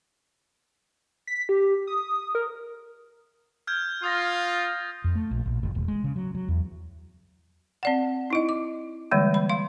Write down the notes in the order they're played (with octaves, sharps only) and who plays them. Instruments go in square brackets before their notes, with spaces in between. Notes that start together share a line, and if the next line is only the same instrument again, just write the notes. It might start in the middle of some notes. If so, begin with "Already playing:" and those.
[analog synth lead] B6
G4
D#6
A#4
[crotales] F6 G6 G#6
[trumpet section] F4 [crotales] D#6 A6 A#6
[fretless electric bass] F2
A3
A#1
A#1
F#1
E1
G#3
C#3
F#3
F#3
E2
[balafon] C4 D5 F#5
D#4 E4 D#5
D6
D3 E3 G3 G#3 A#3
B5
F5 C6